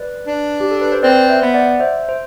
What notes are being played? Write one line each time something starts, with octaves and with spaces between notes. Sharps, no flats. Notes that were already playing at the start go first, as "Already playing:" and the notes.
Already playing: B4 D5
D4
G4
A4
B4
C5
C4 B4 D5
C5 E5
B3
D5 F#5
C5 E5
C5